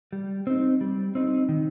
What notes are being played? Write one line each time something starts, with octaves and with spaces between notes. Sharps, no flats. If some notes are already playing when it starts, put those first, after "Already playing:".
G3
C4 D#4
G3
C4 D#4
D#3